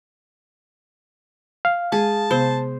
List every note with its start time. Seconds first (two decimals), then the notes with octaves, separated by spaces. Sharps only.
1.65 F5
1.92 G#3 G#4 A5
2.31 C3 B3 C5